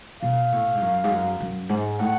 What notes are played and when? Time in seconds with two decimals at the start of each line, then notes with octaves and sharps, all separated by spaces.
0.22 B2 F5
0.52 A2
0.75 G#2
0.82 F#2
1.04 G#2
1.11 F#2
1.40 F#2
1.69 G#2
1.99 A2 F#5